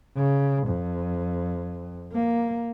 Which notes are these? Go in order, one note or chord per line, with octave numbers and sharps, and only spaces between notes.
C#3
F2
A#3